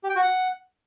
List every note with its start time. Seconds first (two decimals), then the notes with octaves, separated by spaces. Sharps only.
0.03 G4
0.09 G5
0.16 F#4
0.22 F#5